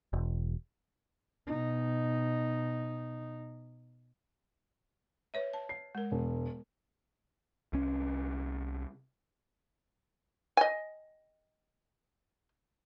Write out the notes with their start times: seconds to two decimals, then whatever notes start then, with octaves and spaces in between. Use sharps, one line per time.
0.13 E1
1.47 B2 D#4
5.34 B4 C#5 E5
5.53 A5
5.69 C7
5.95 G#3 A#4
6.12 E1
7.73 C2 C#4
10.57 D#5 G#5